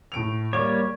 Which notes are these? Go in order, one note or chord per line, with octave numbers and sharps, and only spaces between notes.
A2 D7 F7
G3 A#3 C#5 D6